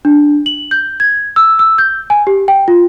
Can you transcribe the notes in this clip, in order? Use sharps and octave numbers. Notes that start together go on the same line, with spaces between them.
D4
F#7
G6
G#6
E6
E6
G6
G#5
G4
G5
F4